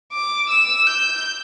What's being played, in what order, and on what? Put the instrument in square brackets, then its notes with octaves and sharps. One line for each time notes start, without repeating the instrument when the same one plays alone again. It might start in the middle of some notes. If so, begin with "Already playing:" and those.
[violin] D6
E6
G6